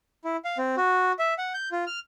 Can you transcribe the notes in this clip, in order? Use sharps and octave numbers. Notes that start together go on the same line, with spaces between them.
E4
F5
C4
F#4
E5
F#5
G6
F4
F6